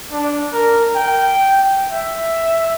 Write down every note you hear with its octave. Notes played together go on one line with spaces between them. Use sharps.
D4
A#4
G5
E5